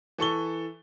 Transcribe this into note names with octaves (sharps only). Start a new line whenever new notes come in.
E3 A4 C#6 G7